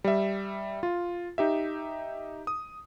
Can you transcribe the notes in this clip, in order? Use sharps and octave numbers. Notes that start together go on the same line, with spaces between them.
G3 E5
F4
D#4 G4 E5
D#6